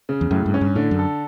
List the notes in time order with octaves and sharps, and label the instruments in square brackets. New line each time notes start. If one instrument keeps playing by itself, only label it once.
[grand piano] C#3
[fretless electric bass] E2
[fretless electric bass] F#2 [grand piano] A2
[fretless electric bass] G2
[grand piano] C#4
[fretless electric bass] G2
[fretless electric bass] A2 [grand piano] D3
[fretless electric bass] F#2
[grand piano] A4